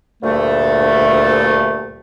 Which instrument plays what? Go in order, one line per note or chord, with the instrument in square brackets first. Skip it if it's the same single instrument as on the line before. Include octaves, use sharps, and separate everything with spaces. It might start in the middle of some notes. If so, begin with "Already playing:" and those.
[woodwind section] D2 G2 A#2 A3